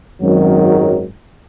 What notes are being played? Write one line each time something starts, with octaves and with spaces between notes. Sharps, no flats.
G#1 F#2 D#3 F#3